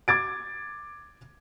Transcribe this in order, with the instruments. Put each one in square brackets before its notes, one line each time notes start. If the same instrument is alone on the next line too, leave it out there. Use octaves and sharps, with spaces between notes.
[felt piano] D6 G#6 A6 D7